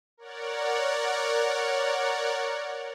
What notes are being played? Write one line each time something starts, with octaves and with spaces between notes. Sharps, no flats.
A#4 C#5 D5 F#5